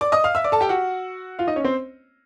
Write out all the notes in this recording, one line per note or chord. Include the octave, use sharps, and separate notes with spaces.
D5 D6
D#5 D#6
F5 F6
E5 E6
D5 D6
A4 A5
G4 G5
F#4 F#5
F4 F5
D#4 D#5
C#4 C#5
C4 C5